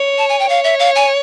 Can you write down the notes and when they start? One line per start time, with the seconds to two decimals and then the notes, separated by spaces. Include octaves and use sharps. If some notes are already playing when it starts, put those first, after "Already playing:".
Already playing: C#5
0.18 A5
0.29 G#5
0.39 G5
0.49 C#5 F5
0.64 E5
0.79 F5
0.95 G#5